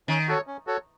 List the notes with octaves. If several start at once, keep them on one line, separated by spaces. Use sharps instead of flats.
D#3 C#4
F#4 A4 C#5
C#4
F#4 A4 C#5